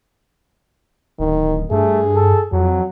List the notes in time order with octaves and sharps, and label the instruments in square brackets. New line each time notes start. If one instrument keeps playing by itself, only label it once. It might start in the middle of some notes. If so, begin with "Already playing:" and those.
[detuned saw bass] D1 [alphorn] D#3
[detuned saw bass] G2 [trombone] A3 [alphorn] G#4
[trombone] A4
[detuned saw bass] F2 [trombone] F#3